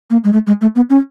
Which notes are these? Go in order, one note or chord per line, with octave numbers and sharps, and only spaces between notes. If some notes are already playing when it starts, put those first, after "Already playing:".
A#3
G#3
A3
G#3
A3
B3
C#4